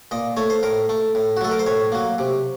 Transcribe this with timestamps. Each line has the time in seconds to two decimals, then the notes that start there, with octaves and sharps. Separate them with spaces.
0.11 A#2 D#5
0.37 A3 C#5
0.50 C5
0.63 A2 A#4
0.89 A3
1.15 A2
1.37 F#4
1.41 F#3 A3 A4
1.51 A#4
1.59 C5
1.66 A2 C#5
1.92 F#3 A#3
2.18 C3